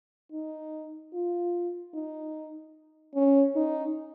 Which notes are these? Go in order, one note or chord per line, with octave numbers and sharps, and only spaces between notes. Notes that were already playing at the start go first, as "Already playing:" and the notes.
D#4
F4
D#4
C#4
D#4